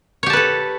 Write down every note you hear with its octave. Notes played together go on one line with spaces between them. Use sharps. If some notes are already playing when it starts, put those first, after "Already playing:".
G4 A4 B4 C#5 A5